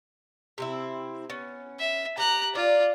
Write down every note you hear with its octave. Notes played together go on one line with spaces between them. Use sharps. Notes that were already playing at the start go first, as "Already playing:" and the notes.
C3 C4 E4
B3 C#4
E5
G4 A#5 F#6
F4 D5